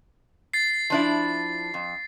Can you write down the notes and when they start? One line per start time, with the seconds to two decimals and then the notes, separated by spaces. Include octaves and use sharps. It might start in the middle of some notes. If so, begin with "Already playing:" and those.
0.54 A6 C7
0.90 F3 D4 E4
1.74 F2